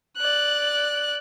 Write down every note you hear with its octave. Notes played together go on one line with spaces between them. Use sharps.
D5 F#6